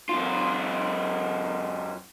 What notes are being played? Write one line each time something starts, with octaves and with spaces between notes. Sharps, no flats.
F#2 F4